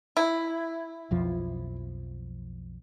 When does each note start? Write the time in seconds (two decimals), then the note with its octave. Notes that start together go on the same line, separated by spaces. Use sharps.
0.17 E4
1.11 B1 F2 F3